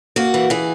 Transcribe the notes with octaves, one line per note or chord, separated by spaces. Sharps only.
A#3 F#4
E3
E3 G#4